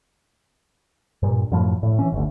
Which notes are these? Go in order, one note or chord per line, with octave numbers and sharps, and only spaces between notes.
G2 A#2
F#2 A2 F3 A3
A2
E3 C#4
G1 D2